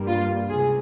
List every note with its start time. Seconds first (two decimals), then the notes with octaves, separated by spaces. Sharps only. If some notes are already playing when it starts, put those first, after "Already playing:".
Already playing: G2 G3 A#3
0.08 F4
0.49 C#2 C3 G#4